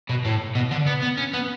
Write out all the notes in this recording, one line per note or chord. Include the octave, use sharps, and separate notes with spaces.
B2
A2
B2
D3
B3
B3
C#4
B3